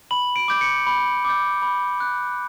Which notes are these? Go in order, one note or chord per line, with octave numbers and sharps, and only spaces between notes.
B5 F#7
D7
D6 G6
C#7
B5
D6 G6
B5
F#6